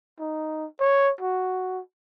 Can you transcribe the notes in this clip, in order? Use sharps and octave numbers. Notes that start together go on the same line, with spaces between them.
D#4
C#5
F#4